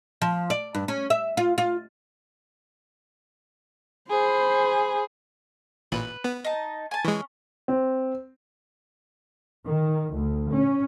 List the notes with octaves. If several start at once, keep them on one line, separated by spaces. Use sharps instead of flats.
F3
D5
G2
C#4
E5
F4
F4
G#4 C5 B5
A1 A#2 B4
B3
D#4 A5
G#5 A5
E3 G#3 C#4
C4
D#3
D2
C#4